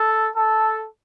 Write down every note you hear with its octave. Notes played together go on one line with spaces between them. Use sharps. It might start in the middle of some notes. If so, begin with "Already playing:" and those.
Already playing: A4
A4